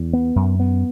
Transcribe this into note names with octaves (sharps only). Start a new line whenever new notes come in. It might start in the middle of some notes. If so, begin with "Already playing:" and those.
Already playing: E2
B3
F#2
B3